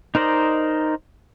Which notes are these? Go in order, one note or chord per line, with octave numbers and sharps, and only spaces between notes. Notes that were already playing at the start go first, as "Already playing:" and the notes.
D#4 A#4 C5 D5 D#5